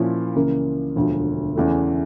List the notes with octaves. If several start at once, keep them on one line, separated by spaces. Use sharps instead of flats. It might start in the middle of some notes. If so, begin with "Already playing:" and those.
Already playing: A#2 F3 C#4 E4
C#2 C#3 E3 A#3
E1 D2 D3 F3
E2 C#3 E3 A3